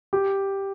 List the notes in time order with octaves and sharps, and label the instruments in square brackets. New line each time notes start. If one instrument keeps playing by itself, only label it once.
[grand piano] G4